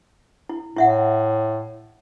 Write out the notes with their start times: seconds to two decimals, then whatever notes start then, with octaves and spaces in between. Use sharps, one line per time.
0.49 E4
0.77 A2 E4 E5 F#5